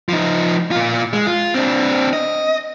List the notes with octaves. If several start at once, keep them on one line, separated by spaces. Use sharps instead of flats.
F3 D#4
A#2 F4
G#3
F4
C4 D4
D#5